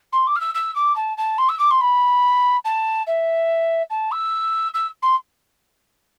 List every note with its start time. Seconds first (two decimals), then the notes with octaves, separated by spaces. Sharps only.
0.12 C6
0.27 D6
0.36 F6
0.40 E6
0.55 E6
0.75 D6
0.96 A5
1.17 A5
1.38 C6
1.49 E6
1.59 D6
1.71 C6
1.81 B5
2.65 A5
3.07 E5
3.90 A5
4.11 E6
4.74 E6
5.02 C6